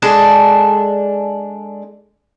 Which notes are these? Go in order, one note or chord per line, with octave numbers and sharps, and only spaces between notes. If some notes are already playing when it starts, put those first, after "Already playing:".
G#3 D4 A4 A5